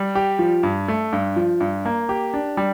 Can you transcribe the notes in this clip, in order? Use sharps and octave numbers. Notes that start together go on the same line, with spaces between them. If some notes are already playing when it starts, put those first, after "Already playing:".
Already playing: G3
G4
F3
G2
A3
G2
F3
G2
A#3
G4
D4
G3